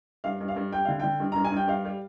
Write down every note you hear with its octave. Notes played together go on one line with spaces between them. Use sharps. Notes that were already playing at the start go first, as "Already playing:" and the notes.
G2 F5
G2
F5
G2
G3 G5
D3 F5
D3 G5
G2
G2 A#5
G#5
G2 G5
G2 F5
G3